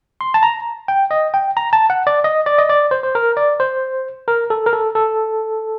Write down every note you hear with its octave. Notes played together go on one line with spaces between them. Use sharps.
C6
A5
A#5
G5
D#5
G5
A#5
A5
F#5
D5
D#5
D5
D#5
D5
C5
C5
A#4
D5
C5
A#4
A4
A#4
A4
A4